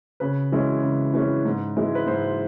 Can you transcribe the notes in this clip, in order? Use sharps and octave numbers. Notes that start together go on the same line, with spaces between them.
C#3 B4
E3 G#3 C#4
C#3
E3 G#3 C#4
G#2
E3 G#3
B4
G#2 C5